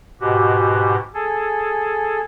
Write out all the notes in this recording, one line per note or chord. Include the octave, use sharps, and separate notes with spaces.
G#2 B2 F#4 G4
G#4 A4